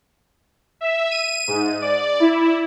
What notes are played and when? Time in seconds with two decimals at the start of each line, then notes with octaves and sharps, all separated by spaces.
0.81 E5
1.11 D#7
1.48 G#2
1.81 D5
2.20 E4